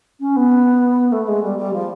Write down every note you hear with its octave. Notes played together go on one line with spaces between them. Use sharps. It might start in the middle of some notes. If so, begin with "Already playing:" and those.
C#4
B3
A3
G#3
G3
G3
F3